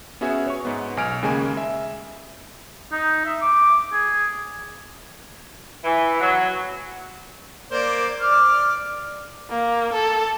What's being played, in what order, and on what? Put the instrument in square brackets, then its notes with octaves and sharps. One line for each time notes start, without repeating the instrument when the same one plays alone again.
[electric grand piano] B3 C#4 F#4 G#4 E5 G#5
C#5 C#6
G#2 B3
B1 G#5 F6 D7
D#2 C#3 G#3 A#3 G#5
E5
[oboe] D#4
E5
D6
G#4
[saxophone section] E3
F#3
[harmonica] A#3 C5 D5
D5 D6 F6
[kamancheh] A#3
A4